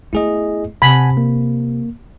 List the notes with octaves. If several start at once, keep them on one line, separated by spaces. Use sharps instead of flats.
A3 B3 E4 G#4 D#5
C3 F#5 G#5 A5 B5
A#3